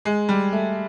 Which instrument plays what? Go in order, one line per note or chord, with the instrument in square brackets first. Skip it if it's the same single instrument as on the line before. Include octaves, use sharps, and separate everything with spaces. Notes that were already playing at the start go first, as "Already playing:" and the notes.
[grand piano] G#3
G3
A3